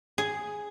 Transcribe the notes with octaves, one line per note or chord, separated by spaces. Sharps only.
G#4